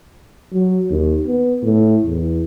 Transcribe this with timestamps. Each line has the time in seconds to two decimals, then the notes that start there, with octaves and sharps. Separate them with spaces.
0.53 F#3
0.90 D#2
1.27 B3
1.63 A2
2.05 E2